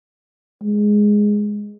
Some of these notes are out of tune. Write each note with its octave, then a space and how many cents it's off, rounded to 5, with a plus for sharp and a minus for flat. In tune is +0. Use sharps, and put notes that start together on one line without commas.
G#3 +0